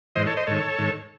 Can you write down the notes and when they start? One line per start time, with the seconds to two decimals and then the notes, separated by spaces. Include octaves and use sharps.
0.15 G#2 E3 C5 D#5
0.27 A4 C#5
0.37 C5 D#5
0.47 G#2 D#3 A4 C#5
0.78 G#2 D#3